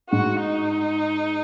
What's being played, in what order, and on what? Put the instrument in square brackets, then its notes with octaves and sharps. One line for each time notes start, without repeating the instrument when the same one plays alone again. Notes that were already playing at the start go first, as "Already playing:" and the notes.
[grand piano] G#2 [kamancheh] F#4
[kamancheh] D#4